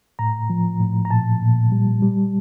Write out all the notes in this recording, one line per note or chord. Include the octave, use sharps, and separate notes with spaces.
A2 A#5
F3
A2
A#5
A#2 A5
A#2
G3
G3